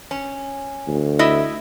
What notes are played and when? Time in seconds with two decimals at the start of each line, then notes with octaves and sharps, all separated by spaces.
0.11 C#4
0.88 D2
1.19 E4 D#5 E5